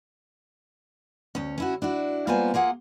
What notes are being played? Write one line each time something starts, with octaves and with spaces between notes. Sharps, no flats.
D2 C#4
C#4 E4 F#4
D4 E4 F#4
G3 A#3 B3 F4 C5 G#5
A#3 F4 G#4 F#5